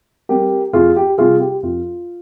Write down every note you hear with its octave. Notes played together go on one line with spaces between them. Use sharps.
G3 C4 G4 A#4
F2 F4 G#4
G4
C3 G3 F4 G#4
G4
F2 F4